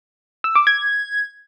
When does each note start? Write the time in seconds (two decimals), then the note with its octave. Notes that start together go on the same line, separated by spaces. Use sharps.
0.44 E6
0.55 D6
0.67 G#6